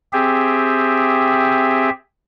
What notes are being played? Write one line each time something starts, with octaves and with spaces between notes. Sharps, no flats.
C4 G4 G#4 E5